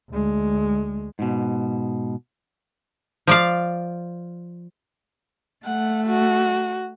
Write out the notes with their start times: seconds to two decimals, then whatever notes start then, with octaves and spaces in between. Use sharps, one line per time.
0.10 D2 G#3
1.19 G#2 B2
3.27 F3 D5 F5
5.65 A3 F#5
6.07 F#4